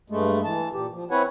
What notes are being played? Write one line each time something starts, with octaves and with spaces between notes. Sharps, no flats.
G2 G#3 A3
E3 A5
A#2 G4
F3
C4 E4 B4 C#5 F#5 G#5